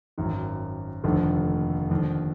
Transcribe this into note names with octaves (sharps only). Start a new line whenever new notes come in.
G#1 F#2 D#3
F1 D#2 D3 F3 A3
D#2 D3 F3